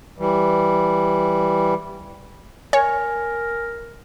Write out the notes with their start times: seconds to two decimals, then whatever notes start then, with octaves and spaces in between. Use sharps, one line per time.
0.19 E3 G3
2.73 A#4 C#5 G#5